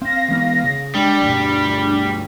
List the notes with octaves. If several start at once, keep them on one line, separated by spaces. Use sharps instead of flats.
C4 F5 A#6
E3 G#3 B3
C#3
G3 G#3 D4
D2 G2 B2